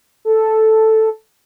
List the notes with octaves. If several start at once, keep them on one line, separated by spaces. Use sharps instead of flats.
A4